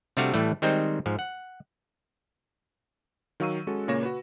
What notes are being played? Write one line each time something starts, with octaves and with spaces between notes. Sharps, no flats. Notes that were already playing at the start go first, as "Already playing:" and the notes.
C3 G3 A3 D4 F#4 F5
A2 E3 G3 A3
D#3 G3 G#3 C4 D#4 C5
G#2 F3
F#5
D#3 F#3 F5 C#6 E6 D#7
G#3 C#4 F#4 A4
A#2 C#3 A#3 C#5 A#6 E7
F#4 B4